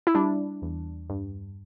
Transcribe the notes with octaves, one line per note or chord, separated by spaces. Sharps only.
E4
G3 D4
E2
G2